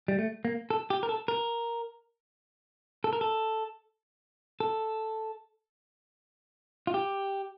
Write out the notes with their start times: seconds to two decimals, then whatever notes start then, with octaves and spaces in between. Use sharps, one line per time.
0.08 G3
0.19 A3
0.45 A#3
0.70 A4
0.90 G4
1.03 A#4
1.09 A4
1.28 A#4
3.04 A4
3.13 A#4
3.21 A4
4.60 A4
6.87 F4
6.94 G4